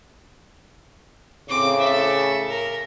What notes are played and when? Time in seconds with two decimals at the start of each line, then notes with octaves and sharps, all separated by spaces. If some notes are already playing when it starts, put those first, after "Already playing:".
1.49 A2 C#3 C4 D6
1.79 A4 E5
2.49 A#4